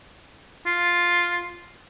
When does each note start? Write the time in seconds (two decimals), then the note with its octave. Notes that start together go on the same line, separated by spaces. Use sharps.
0.66 F4